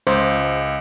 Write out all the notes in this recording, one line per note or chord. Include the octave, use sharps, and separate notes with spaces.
C#2 C5